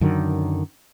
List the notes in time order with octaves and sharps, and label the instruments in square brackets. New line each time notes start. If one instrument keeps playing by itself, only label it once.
[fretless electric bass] F#2 D3 D#3 F#3